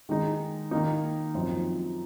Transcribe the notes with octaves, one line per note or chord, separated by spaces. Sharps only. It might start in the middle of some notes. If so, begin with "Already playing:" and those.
D#3 G#3 D#4
D#3 A#3 D#4
F#2 F3 C4 D#4